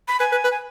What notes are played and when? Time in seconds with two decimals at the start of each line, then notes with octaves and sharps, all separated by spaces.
0.08 B5
0.20 B4 G#5
0.32 B4
0.44 B4
0.51 G#5